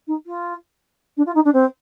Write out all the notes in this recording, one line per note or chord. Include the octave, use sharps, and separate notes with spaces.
D#4
F4
D4
F4
D#4
D4
C4